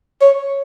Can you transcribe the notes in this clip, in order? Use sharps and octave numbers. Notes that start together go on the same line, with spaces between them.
C#5